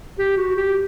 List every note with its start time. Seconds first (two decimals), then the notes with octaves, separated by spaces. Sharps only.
0.19 G4
0.37 F#4
0.56 G4